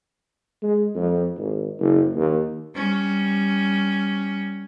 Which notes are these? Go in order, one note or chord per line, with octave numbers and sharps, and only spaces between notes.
G#3
F2
G#1
F#1
D#2
G3 C#4